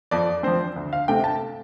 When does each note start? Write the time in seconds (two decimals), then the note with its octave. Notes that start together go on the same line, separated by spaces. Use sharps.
0.11 F2 D5
0.43 F3 C4 C5
0.76 D2
0.93 F5
1.08 C3 A3 G5
1.24 A5